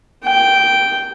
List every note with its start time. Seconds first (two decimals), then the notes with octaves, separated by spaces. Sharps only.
0.25 G5